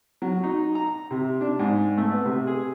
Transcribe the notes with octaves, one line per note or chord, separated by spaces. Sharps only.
F#3
D#4
A#5
C3
D4
G#2
A3
B3
C3
G#4